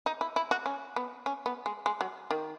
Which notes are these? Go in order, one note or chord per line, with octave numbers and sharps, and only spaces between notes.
D#4
E4
E4
F#4
C#4
B3
C#4
B3
G#3
G#3
F#3
D#3